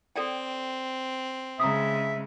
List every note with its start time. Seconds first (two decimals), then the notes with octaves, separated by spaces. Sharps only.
0.16 C4 A4 D5 G5
1.60 C#3 G#3 E5 A#5 D#6